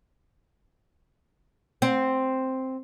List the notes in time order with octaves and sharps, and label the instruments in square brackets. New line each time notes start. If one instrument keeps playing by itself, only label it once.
[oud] C4